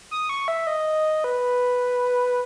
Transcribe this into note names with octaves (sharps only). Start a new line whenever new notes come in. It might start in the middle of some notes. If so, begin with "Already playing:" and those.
D#6
C#6
E5
D#5
B4